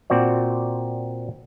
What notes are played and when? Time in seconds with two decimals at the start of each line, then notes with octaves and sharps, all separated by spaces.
0.10 A#2 C4 F#4 D5